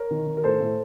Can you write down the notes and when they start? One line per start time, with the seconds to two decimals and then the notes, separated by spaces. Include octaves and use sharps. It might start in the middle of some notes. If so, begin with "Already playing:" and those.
Already playing: A#4 C#5
0.11 D#3
0.27 D#3
0.37 A#4
0.44 A2 A4 C5
0.60 A2